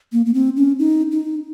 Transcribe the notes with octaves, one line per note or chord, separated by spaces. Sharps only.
A#3
A#3
C4
C#4
D#4
D#4